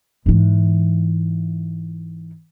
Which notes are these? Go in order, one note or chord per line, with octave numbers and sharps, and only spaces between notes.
G#2 E3